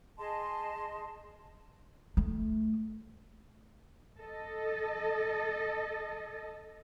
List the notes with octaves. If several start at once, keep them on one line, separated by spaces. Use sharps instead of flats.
G#4 D#5 A5 C6
A3
A4 D#5